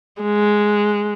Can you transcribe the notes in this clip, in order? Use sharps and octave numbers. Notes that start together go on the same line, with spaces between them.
G#3